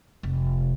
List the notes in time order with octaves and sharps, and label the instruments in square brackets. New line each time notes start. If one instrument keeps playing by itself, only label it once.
[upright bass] F1